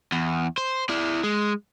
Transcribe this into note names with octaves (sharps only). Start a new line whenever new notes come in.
E2
C5
E4 D5
G#3